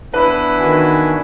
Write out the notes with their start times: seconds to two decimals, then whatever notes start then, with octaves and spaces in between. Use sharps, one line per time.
0.14 E3 B3 D4 E4 B4
0.60 D#3 F#4 G#5